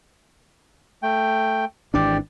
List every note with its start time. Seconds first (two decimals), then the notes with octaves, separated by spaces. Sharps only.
1.03 A3 G5
1.94 G#1 E3 D4 G4 D5